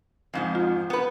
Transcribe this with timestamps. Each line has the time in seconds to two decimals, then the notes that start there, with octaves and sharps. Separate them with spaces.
0.34 F2 G#2 F3
0.55 F4
0.90 B3 B4